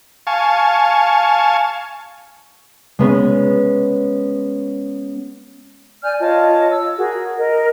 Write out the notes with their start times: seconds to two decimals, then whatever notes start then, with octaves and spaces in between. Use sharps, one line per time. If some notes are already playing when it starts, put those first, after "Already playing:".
0.27 F5 G#5 A5 C#6
2.99 G#3 B3 C#4
6.03 D5 G#5 F6 G6
6.19 F4 C#5 D#5 A5
6.70 E6
6.97 F#4 G#4 A#4
7.37 A#4 D#5